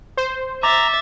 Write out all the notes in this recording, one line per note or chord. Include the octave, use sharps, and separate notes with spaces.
C5
E5 A#5 D6 A6